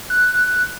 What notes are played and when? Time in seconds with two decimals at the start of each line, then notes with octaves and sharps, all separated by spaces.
0.10 F#6